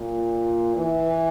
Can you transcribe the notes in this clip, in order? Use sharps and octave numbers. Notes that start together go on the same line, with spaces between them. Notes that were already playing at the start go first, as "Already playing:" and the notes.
Already playing: A#2
E3